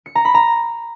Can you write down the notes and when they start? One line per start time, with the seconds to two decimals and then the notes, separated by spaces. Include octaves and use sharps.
0.06 C#7
0.15 A#5
0.25 B5
0.34 A#5